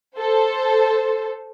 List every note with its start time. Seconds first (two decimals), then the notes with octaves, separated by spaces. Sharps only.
0.16 A4 C5